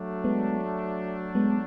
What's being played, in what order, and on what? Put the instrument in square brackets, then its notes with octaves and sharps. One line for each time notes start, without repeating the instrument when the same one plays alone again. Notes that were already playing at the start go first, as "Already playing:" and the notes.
Already playing: [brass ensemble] F#3 A3 D4
[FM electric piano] G#3 B3
G#3 B3